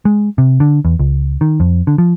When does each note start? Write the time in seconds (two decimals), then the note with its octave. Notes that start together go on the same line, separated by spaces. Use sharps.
0.05 G#3
0.38 C3
0.60 D3
0.85 E2
0.99 C#2
1.41 D#3
1.60 F2
1.87 D3
1.98 F3